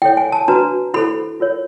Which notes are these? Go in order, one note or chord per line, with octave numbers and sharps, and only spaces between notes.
E4 A4 C#5 G5
G#5
A5
D4 F#4 B4 A#5
E4 A4 C5 B5
F4 A#4 C#5